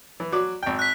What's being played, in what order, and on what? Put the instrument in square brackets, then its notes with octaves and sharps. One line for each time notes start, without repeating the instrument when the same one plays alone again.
[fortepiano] E3
F#3 D5
G#1 G5
[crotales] F#6 B6